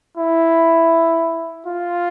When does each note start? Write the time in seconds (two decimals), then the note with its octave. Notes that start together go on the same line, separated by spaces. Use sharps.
0.17 E4
1.66 F4